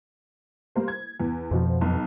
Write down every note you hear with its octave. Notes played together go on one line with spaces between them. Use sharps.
G3 A#3 C5
G#6
E2
F2 B2 F3 F#4 C5
B1